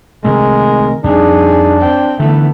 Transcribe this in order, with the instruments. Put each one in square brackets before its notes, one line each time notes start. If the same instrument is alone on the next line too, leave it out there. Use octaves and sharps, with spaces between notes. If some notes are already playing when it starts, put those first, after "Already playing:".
[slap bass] C3 D#3 A3 [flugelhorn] G#3 [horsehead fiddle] A#4
[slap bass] F2 G3 [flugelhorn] D4 [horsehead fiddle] D#4 G#4
[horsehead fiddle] C4 G5
[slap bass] D3 E3 [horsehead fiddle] A3 B3